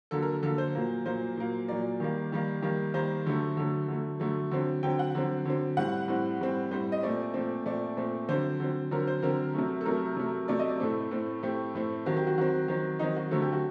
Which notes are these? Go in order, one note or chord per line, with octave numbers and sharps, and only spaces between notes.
D3 F#3 A#3 A4
A#4
A4
D3 F#3 A#3 A4
C5
A#2 F#3 A#3
A#2 F#3 A#3 C5
A#2 F#3 A#3
A#2 F#3 A#3 D5
D#3 G3 A#3
D#3 G3 A#3
D#3 G3 A#3
D#3 G3 A#3 C5
D3 F#3 A3
D3 F#3 A3
D3 F#3 A3
D3 F#3 A3
D3 F#3 C4
D3 F#3 C4 G5
F#5
D3 F#3 C4
D3 F#3 C4
A2 G3 C4 F#5
A2 G3 C4
A2 G3 C4
A2 G3 C4 C5
D#5
A#2 A3 C4 D5
A#2 A3 C4
A#2 A3 C4 D5
A#2 A3 C4
D3 F#3 C4 C5
D3 F#3 C4
D3 F#3 C4 A#4
C5
D3 F#3 C4 A#4
C3 F#3 A3
A4
C3 F#3 A3 A#4
C3 F#3 A3
C3 F#3 A3 D5
D#5
D5
A2 A3 C4 A4
A2 A3 C4
A2 A3 C4 G4
A2 A3 C4
D#3 F#3 C4 F#4
G4
F#4
D#3 F#3 C4 F#4
D#3 F#3 C4
D#3 F#3 C4 D#4
F#4
D3 F#3 A3 C4 A4
G4
F#4